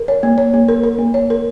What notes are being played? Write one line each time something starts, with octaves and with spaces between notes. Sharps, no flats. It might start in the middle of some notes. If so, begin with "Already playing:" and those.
Already playing: A#4
C#5
A#3
C#5
A#3
A#4
A#4
A#3
C#5
A#4